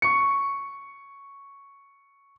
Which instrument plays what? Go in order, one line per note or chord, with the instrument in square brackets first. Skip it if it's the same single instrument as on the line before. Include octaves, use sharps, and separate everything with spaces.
[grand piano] C#6 C#7